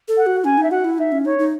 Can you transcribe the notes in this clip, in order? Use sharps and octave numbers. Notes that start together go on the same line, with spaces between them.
A4
F#5
F#4
C#4 G#5
D#4 E5
F#4 F#5
E4
D#4 E5
C#4
D#4 C#5
D#4